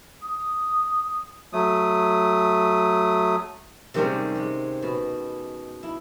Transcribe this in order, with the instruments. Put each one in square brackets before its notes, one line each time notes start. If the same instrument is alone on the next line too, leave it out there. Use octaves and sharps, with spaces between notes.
[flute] D#6
[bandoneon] F#3 A3 D#6
[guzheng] C3 D#3 G3 G#3 C4 C#4
G#3
B2
E4